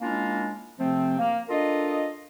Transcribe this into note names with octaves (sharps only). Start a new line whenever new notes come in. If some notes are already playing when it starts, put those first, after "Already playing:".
G#3 A#3 C#4 D4 E4 F4
C3 F3 A3 C4
A#3
D4 F4 A4 A#4 D#5